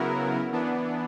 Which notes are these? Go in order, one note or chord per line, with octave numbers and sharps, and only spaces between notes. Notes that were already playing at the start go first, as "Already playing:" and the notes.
Already playing: C#3 F#3 B3 E4 A#4
E3 B3 D4